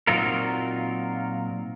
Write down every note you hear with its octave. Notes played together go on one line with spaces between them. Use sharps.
A#2 F#3 C4 D#4 F4 A#4